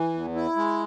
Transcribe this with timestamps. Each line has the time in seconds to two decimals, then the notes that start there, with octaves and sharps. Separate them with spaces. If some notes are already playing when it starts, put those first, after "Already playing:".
Already playing: E3
0.14 E2
0.35 E4
0.56 G#3